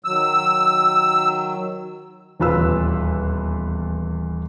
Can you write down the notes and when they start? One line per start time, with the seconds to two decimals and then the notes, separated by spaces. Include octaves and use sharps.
0.05 D#3 F#3 E6
2.40 D#1 E2 F4 B4 E6